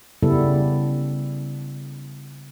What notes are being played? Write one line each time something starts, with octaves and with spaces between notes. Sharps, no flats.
C#3 G3 B3 E4 A4